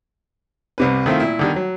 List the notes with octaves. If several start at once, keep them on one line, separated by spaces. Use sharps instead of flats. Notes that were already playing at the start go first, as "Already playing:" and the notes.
C2 C3 B4
D#3 A3 C4 E4 F4
A#2 E4
D3 D#3 G3
F#3